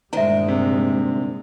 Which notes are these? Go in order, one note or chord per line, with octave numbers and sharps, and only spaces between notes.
D2 G2 A#2 D#3 G#3 D4 E5 A#5
C3